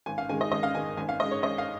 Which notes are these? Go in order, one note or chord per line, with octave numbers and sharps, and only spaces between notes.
G#1 G#5
F5
G#2 D#3 G#3 G#5
D#5
G#1 D#5
F5
G#2 D#3 G#3 G#5
G#1 G#5
F5
G#2 G#3 D#5
C#5
G#1 D#5
F5